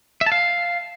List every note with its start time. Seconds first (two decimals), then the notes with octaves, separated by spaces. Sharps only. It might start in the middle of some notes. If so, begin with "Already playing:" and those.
0.21 E5
0.26 A5
0.32 F5